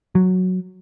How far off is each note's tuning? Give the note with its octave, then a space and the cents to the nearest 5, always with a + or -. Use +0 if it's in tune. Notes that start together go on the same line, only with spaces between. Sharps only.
F#3 -5